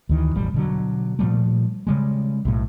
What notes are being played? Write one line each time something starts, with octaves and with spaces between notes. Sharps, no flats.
D2 D#3 E3
E1 A1 G3
B2 D3 F#3
A#2 F3 G3 A3
C#3 G3 G#3
B1 A2